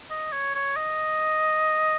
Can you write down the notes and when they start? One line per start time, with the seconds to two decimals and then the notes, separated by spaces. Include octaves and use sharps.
0.10 D#5
0.33 C#5
0.55 C#5
0.77 D#5